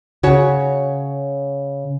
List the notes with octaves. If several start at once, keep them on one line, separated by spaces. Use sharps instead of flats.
C#3 F#4 C#5